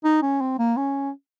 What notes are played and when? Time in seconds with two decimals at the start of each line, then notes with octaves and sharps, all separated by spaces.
0.04 D#4
0.22 C#4
0.41 C4
0.59 A#3
0.77 C#4